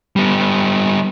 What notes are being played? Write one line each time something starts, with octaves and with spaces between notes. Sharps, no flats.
G3 B3